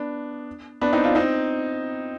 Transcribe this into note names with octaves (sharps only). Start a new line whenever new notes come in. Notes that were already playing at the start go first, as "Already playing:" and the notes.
Already playing: B3 D4
B3 D4
C4 D#4
D4 F4
C4 D#4